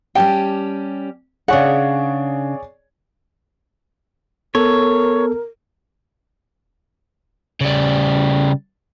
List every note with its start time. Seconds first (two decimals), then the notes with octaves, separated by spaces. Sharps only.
0.15 G3 C#4 G4 G5 A5
1.48 C#3 D4 G#4 C#5 D5 F#5
4.55 B3 A4 A#4 C#5
7.61 C#3 G3